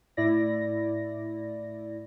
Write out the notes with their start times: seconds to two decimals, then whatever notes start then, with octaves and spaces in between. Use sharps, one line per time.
0.17 A2 E4 D5 A#6